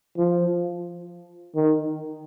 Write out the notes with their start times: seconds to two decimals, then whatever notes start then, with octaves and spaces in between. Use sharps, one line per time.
0.17 F3
1.56 D#3